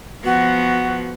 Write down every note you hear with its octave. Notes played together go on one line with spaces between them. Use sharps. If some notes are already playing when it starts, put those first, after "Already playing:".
F3 B3 F#4